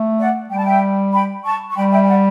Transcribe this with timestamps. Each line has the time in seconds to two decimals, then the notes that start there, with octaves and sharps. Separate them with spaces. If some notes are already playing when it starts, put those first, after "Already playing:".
Already playing: A3
0.18 D5 F#5
0.49 G3 G5
0.57 A5
0.64 E5 G5
1.12 G5 B5
1.44 A5 C#6
1.71 C#6
1.76 G3 G5 B5
1.91 E5 G5
2.02 G5
2.08 D5 F#5